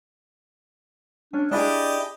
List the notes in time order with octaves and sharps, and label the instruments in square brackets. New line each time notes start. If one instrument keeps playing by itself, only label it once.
[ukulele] C#4 [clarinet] D4
[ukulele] D4 E4 G#4 [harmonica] G4 D#5 [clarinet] D5